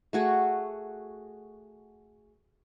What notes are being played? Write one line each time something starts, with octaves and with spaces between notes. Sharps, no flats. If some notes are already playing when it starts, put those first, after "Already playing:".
A3 F#4 G#4